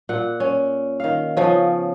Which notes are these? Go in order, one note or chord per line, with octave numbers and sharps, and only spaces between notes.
A#2 F#5
C#4
D#3 F5
C#3 F3 B3 C#4